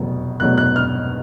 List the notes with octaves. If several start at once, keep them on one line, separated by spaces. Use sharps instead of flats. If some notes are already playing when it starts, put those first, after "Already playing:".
Already playing: F1 E2 B2 F#3 A3
F1 E2 B2 F#3 A3 F#6
F#6
F6